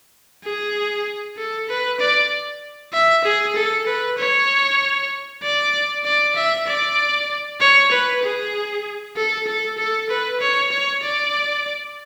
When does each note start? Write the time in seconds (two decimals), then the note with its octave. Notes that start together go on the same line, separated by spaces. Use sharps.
0.44 G#4
1.37 A4
1.69 B4
2.00 D5
2.93 E5
3.24 G#4
3.55 A4
3.87 B4
4.18 C#5
5.42 D5
6.04 D5
6.36 E5
6.67 D5
7.60 C#5
7.91 B4
8.23 G#4
9.16 A4
9.47 A4
9.78 A4
10.09 B4
10.40 C#5
10.72 C#5
11.03 D5